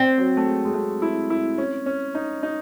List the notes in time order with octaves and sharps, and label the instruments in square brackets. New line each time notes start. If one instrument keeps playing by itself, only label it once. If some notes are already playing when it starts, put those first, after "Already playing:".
Already playing: [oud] C4
[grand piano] F#3
A3
G#3
G#3
A3
E4
E4
C#4
C#4
D#4
D#4